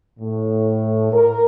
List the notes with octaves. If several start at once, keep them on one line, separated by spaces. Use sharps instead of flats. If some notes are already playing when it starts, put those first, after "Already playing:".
A2
A#4